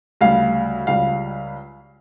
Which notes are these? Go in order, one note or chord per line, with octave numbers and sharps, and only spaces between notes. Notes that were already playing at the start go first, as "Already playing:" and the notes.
D2 C#3 G3 F5
C#2 C#3 G3 F5